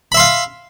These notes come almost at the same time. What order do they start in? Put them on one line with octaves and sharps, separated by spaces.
B5 E5 C6 F5